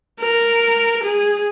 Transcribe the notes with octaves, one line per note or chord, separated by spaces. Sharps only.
A#4
G#4